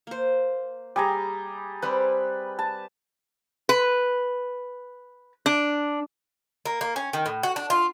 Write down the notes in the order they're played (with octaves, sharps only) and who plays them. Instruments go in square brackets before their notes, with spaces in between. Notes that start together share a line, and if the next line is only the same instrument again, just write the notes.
[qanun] A#3 C5
[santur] G3 G#4 A#5
[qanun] G3 C4 [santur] B4
[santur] A5
[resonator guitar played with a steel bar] B4
D4
[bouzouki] A#3
A#3
C#4
D#3
A2
F#4
D4
F4